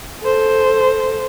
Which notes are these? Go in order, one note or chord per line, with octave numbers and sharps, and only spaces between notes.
A4 C5